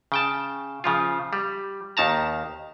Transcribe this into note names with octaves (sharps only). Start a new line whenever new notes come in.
C#3 G5 A5
C#3 F3 F4
G3
D#2 D#3 A5 A#5